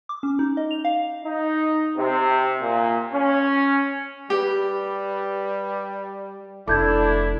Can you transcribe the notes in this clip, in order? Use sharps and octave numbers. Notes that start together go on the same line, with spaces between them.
D6
C#4
D#4
D#5
F7
F5
D#4
C3
A#2
C#4
G3 G4 B4
F1 D4 E4 A4 D6 G6 G#6